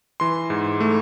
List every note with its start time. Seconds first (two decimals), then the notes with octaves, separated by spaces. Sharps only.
0.20 E3 C6
0.50 G#2
0.80 A3